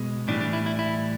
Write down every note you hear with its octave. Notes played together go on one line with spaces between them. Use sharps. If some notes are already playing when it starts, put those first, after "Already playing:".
Already playing: B2 G#3
A2 E3 G3 D4
D4
E4
E4
E4